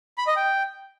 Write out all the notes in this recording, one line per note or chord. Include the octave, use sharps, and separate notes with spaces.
B5
D#5
G5